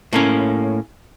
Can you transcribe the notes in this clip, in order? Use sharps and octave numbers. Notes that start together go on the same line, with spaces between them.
A2 A#3 C#4